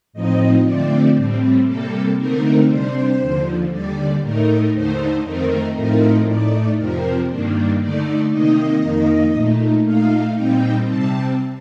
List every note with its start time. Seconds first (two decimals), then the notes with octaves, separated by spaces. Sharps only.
0.13 A2 F3 C4 D#4 D#5
0.64 D3 F3 A3 C4 D5
1.16 A2 G3 C4
1.66 C3 G3 A#3 A4
2.18 D3 A3 C4 D#4 A#4
2.69 C3 G3 D4 C5
3.20 D#2 D3 F3
3.71 D#2 D3 G3 D5
4.22 A2 A3 D#4 A#4
4.73 D#2 D3 A3 D#4 C5
5.24 F2 D#3 A3 C4 D#4 A#4
5.75 A2 F3 A3 C4 D#4 A#4
6.26 A2 A3 D#4 D5
6.77 F2 C3 F3 C4 A#4
7.29 G2 D#3 G3 A#3 D4
7.80 D3 A3 D#4 D5
8.31 C3 D#3 A#3 D#4 D#5
8.82 F2 D#3 A#3 D#4
9.33 A#2 A3 D#4
9.84 A#2 A3 D#4 F5
10.35 A#2 G3 C4 D#4 G5
10.87 C3 G3 C4 A5